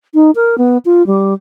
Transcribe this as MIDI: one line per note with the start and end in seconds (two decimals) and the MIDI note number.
0.14 0.31 63
0.35 0.58 70
0.58 0.78 59
0.85 1.05 65
1.07 1.34 55